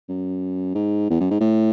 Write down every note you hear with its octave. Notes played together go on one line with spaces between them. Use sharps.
F#2
G#2
E2
F#2
G#2
A2